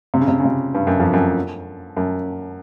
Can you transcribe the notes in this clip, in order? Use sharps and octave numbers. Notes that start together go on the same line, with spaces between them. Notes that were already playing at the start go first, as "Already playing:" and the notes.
C3
C#3
C3
C#3
C3
G2
F#2
F2
F#2
F#2